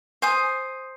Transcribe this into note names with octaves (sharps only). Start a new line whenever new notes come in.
C5 G#5 D#6